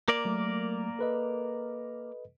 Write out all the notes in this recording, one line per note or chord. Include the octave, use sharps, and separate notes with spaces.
A#3 A#4 D5
F#3 A3
A4 B4 D#5